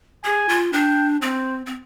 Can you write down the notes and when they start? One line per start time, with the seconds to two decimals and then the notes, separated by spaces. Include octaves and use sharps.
0.24 G#4 G#5
0.49 F4
0.72 D4 G5
1.22 C4 C5
1.66 C4